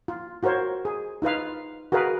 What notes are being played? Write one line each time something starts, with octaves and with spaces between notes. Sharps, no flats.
F4
F4 F#4 A#4 C5 C#5
G#4
D#4 F4 B4 F5
F#4 G#4 A#4 B4 F5